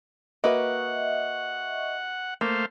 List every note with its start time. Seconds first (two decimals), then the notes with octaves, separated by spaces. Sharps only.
0.44 A#3 F#4 B4 D#5 E5 F#5 C#6
2.41 A3 A#3 C5 F5